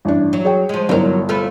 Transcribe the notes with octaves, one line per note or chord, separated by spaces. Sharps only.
A1 G2 D4
F#3
G#4 C#5 G5
F3 G#3
G1 C2 F#3 A#4 C5
A3 F4 B4